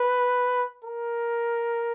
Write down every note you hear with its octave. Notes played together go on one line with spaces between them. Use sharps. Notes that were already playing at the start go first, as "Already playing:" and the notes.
Already playing: B4
A#4